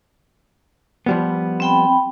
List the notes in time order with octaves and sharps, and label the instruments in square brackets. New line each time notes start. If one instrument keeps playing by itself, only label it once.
[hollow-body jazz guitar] F3 G3 B3
[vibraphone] C4 G5 B5